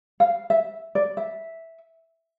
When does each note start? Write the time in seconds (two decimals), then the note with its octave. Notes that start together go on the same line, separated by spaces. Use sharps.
0.20 F5
0.50 E5
0.95 D5
1.17 E5